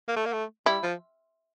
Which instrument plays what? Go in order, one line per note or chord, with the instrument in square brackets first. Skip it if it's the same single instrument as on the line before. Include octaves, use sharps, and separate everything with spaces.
[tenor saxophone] A#3
A3
A#3
A3
[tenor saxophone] G3 [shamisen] E4
[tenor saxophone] F3